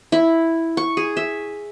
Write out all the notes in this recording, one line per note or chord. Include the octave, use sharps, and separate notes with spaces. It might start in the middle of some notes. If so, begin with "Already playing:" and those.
E4
C#6
G#4
E5